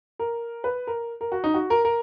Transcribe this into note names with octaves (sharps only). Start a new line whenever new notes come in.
A#4
B4
A#4
A#4
F#4
D#4
F#4
A#4
A#4